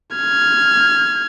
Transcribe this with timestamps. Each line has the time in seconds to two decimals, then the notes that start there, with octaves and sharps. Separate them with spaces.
0.17 F6 G#6